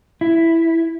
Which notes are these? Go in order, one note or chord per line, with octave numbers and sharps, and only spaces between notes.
E4